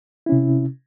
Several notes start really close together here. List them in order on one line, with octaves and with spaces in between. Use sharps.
E4 C#4 C3